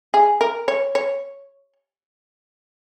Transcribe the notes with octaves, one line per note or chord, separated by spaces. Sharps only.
G#4
A#4
C#5
C#5